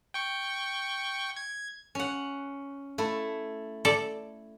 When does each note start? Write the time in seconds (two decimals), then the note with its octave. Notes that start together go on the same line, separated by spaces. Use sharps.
0.14 G5 C#6
1.37 G#6
1.95 C#4 F#5
2.98 A3 E4
3.85 A4 D5